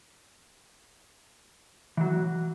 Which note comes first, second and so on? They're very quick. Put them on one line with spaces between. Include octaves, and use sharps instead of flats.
E3 F#3 F#4